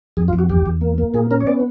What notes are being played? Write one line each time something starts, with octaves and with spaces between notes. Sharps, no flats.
F2 G#4
F4
F2
F#4
E2 G4
E2
A#3
A#3
A#2 G#4
C#4 A#4
C#5
B3 D5